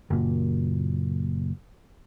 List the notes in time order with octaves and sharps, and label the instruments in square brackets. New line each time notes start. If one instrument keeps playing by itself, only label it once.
[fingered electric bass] F#1 A#2